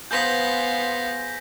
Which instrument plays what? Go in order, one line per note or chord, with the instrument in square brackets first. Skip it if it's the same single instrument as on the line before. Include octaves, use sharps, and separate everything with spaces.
[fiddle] B3 F5 [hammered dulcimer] G#4 B4 C5 [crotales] G6 A#6 B6